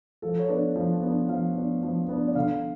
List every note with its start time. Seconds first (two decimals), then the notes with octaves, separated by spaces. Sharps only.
0.22 F3 A4
0.39 C#5
0.49 B3 D4 B4
0.76 F3
1.03 B3 D4
1.29 F3 F5
1.56 B3 D4
1.83 F3
2.09 B3 D4
2.28 D5
2.35 D3 F5